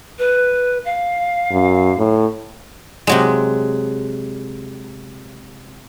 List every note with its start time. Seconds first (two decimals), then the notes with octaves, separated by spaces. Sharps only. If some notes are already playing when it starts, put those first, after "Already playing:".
0.19 B4
0.85 F5
1.51 F#2
1.97 A2
3.07 C3 F#3 G#3